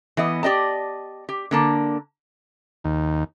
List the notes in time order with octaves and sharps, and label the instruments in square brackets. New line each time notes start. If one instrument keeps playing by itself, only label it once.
[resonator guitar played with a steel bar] E3 B3 D#5
G4 D5 D#5 A5
G4
D3 A#3 A5
[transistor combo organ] D#2